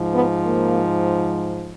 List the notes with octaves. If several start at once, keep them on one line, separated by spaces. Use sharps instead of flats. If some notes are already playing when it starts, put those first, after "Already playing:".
Already playing: G#2 F3
B3
A#3